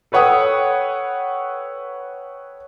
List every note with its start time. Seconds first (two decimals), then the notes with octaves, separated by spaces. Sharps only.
0.12 A4 B4 C#5 F#5 G5 D#6